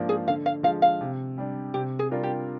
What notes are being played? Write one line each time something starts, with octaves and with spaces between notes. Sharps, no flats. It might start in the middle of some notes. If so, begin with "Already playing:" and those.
Already playing: G#2 F3 A#3 D4
G#4
D3 F5
F5
F3 G#3 F5
F5
C3
G3 D4
C3 G4
G#4
G3 D4 F4 A#4
G4